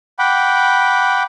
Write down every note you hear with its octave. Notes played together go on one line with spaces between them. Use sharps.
F#5 G5 B5 D6